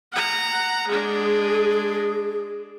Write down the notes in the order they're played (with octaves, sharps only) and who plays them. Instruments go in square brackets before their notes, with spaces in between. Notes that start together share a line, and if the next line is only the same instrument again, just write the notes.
[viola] F#5 A#5
[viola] G#3 D4 [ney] G#4